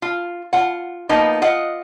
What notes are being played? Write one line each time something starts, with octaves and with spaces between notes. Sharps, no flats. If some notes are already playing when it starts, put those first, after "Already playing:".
F4
F4 F#5
F3 A#3 B3 D#4
F4 D#5 F#5